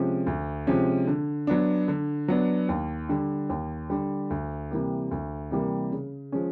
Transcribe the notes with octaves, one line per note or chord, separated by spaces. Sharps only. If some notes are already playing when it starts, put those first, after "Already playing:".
Already playing: C3 F3 G#3 C#4
D2
C3 F3 G#3 C#4
D3
F#3 B3 D4
D3
F#3 B3 D4
D#2
D3 G3
D#2
D3 G3
D2
C3 E3 G3 A#3
D2
C3 E3 G3 A#3
C#3
F3 G#3 C#4